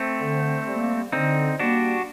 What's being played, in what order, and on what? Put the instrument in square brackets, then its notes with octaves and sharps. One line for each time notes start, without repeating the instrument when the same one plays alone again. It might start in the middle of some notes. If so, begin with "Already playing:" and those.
Already playing: [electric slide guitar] A3 C4
[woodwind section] D3
G3 A#3
[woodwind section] D3 [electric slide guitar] C4 D#4
[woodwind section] G3 A#3 [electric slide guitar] D4 F#4